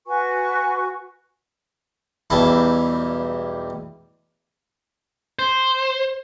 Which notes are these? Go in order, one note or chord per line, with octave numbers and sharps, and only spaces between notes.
F#4 B4 G#5 C#6
B1 E2 G3 E4 A5
C5